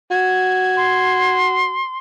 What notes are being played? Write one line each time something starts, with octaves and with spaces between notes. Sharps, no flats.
F#4 G#6
C6